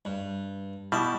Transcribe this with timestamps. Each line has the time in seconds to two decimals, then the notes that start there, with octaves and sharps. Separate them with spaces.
0.05 G2
0.92 B2 G3 E4 A5